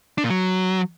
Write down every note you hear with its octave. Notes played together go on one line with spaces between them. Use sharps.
D4
A#2
F#3